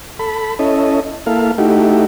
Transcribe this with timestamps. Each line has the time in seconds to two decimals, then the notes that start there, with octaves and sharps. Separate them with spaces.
0.19 A4 B5
0.59 C#4 E4 A4 D#5
1.26 A#3 E4 A4 F5
1.58 A3 D#4 E4 F#4 G4